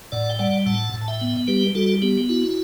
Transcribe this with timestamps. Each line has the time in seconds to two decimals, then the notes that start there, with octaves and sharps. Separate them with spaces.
0.12 A2 D5 F#5
0.30 G5
0.39 G3 D5 F#5
0.66 A2 F#5 A5
0.94 A2
1.01 A5
1.08 E5 G5
1.21 B3
1.48 G3 G4 B4
1.75 G3 F#4 A4
2.02 B3 G4
2.29 E4 F#4